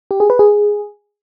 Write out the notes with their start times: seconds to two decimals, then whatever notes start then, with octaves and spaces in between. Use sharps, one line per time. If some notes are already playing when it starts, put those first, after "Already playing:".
0.11 G4
0.20 G#4
0.30 B4
0.39 G#4